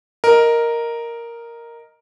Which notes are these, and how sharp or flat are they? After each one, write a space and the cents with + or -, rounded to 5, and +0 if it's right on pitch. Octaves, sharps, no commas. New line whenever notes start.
A#4 +0 D#5 +0